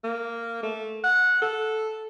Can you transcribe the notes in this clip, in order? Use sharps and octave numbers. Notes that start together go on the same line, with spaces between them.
A#3
A3
F#5
A4